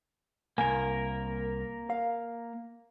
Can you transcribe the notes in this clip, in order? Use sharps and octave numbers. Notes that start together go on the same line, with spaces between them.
C2 A#3 A#4 G#5
F5